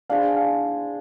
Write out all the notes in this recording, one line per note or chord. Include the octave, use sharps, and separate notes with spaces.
D4 G#4 C5 F5
F5